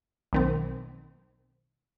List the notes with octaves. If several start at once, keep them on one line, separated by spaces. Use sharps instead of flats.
B1 D#3 C4